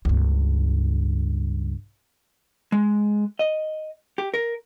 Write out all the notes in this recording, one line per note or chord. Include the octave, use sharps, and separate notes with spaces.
C#2 G2
G#3
D#5
G4
A#4